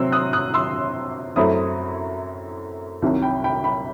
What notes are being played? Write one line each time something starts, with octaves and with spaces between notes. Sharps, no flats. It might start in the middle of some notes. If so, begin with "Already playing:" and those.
Already playing: C3 F#3 C4 C6 E6
D#6 F#6
D#6 F#6
C6 E6
F#2 F#3 A3 C4 E4 B5 D#6
C2 C3 D#3 F#3
G5 B5
G5 B5
G5 B5